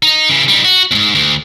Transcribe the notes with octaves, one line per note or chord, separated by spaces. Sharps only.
D#4
C#3 E3
G3 D#4
F#4
E2 G#2
D2